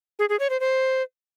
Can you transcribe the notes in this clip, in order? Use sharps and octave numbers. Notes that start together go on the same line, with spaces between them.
G#4
G#4
C#5
C5
C5